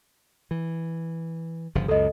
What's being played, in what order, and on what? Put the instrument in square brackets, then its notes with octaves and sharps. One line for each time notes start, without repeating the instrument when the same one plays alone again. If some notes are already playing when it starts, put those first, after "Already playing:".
[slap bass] E3
G1 C#3 F3
[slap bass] C#2 F#2 [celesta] A4 D#5